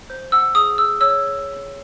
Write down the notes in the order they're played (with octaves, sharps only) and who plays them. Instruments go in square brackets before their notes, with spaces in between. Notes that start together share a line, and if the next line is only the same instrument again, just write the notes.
[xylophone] C5
F#5 E6
G#4 D#6
G#4 E6
C#5 E6